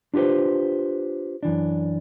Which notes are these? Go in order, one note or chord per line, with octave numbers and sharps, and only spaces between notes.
D4 F4 G4 B4 C5
F#2 E3 D4